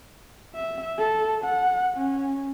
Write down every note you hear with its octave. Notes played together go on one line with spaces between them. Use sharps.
E5
A4
F#5
C#4